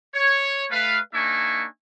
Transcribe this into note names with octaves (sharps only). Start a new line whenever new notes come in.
C#5
A3 B4 F5
A#3 D4 D#4 E5 G#5 C#6